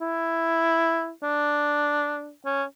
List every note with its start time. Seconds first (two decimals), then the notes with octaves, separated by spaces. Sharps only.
0.01 E4
1.23 D4
2.46 C#4